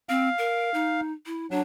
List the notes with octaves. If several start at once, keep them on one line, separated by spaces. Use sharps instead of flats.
C4 F5
A#4
D#4
E4
F#3 D4